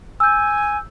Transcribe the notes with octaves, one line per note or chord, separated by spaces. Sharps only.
G#5 E6 G6